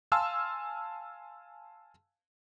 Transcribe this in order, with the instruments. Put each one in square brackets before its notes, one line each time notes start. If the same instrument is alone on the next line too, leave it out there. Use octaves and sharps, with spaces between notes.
[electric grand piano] F5 G#5 A5 C6 E6 F6